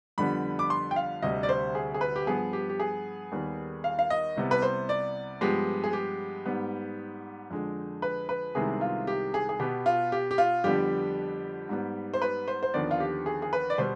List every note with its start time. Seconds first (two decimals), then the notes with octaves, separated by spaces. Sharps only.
0.18 F2 D3 G3 B3 B5
0.59 D6
0.70 C6
0.91 G5
0.96 F5
1.22 D2 C3 G3 D#5
1.43 D5
1.49 C5
1.75 G#4
1.94 G#4
2.01 B4
2.16 G4
2.27 G2 F3 B3 G#4
2.53 G4
2.70 G4
2.80 G#4
3.32 D#2 D#3 G3 B3
3.84 F5
3.99 F5
4.10 D#5
4.36 C2 C3 G3 B3
4.51 B4
4.62 C5
4.89 D5
5.41 G2 F3 G#3 B3 G4
5.84 G#4
5.93 G4
6.46 G#2 G3 B3
7.51 F2 D3 G#3
8.02 B4
8.29 B4
8.55 C2 C3 D#3 G#3 B3 G#4
8.81 F4
9.07 G4
9.34 G#4
9.49 G#4
9.59 B2 B3 G4
9.86 F4
10.12 G4
10.31 G4
10.38 F4
10.64 F2 D3 G3 B3 G4
11.69 G#2 G3 B3
12.14 C5
12.22 B4
12.48 C5
12.63 C5
12.74 D#2 D3 F3 B3 D5
12.91 F4
13.00 G4
13.26 G#4
13.42 G#4
13.53 B4
13.70 D5
13.78 B2 G3 C5